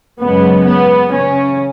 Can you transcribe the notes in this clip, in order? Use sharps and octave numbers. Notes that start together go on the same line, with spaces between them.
F#2 C#3 G#3 B3
B3
C#3 C#4